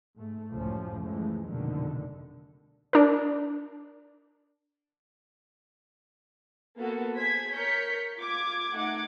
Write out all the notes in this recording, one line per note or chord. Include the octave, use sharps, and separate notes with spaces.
G#2 A3
C#2 F#2 A2 F3 A3 C#4
C#3 E3 F3 G#3 A3
F1 A#1 F#2 B2 D3 D#3
D4 A#4
A#3 B3 F#4 A4
G#4 C5 G#6 B6
A#4 C#5 G6 B6 C#7
F4 D6 G#6
A3 D#4 F#5 D6 G#6